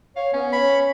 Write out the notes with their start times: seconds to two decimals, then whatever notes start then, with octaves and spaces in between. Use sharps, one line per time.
0.16 C#5 F5
0.34 B3 C#4
0.53 C#5 B5